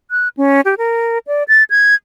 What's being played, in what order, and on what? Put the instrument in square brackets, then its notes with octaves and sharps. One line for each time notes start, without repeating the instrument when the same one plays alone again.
[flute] F#6
C#4
G4
A#4
D5
A6
G#6